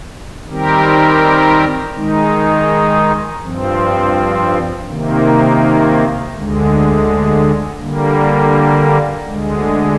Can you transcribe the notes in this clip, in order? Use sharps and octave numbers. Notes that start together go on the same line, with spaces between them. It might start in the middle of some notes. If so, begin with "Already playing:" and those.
D#3 G3 C4 G4 A#4
D#3 G#3 D#4
G2 F3 C4
C3 D#3 A#3
D2 D3 G#3
D3 G3 A#3
D2 D3 G#3